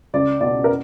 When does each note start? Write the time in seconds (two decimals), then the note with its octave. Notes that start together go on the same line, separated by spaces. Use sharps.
0.13 C#2 D5
0.41 B2 D5
0.64 A#4